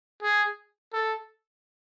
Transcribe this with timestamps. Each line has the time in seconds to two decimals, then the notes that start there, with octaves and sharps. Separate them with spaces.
0.23 G#4
0.93 A4